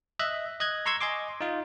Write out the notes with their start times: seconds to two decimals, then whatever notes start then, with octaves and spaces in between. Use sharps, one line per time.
0.19 D#5 E5 F#6
0.60 D#5 F#6 G#6
0.86 A#5 C6 C#6 E6 G#6
1.01 D#5 G#5 C6 D6
1.41 D#4 F4